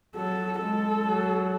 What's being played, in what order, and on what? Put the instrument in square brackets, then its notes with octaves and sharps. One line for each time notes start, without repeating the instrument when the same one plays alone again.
[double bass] F#3 [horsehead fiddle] A4
[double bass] G#3 [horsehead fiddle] A4
[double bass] F#3